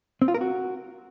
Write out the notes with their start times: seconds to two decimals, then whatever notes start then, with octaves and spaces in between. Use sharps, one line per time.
0.22 C4
0.28 F4
0.34 A#4
0.41 F#4